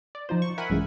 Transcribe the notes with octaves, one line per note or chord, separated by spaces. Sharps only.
D5
F3 D#4 F4 C5
C#6
A#4 E5 F#5 G#5 B5
B1 G2 C#3 E3 G#3